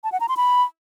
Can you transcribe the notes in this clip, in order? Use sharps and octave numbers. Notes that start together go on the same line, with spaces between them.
A5
F#5
A#5
C6
B5